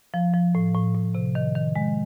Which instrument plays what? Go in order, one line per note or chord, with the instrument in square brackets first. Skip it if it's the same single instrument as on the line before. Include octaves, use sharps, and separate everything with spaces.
[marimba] F3
F3
A2
A2
A2
C3
D#3
D#3
G#3